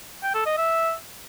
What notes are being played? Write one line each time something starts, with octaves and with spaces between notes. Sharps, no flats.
G5
A4
D#5
E5